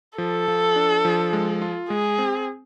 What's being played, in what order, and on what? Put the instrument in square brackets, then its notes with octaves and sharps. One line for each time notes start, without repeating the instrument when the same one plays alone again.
[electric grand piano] F3 [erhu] A4
[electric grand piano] F3
D4
F3
G#3
F4
[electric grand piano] G#3 [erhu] G#4
[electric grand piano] C4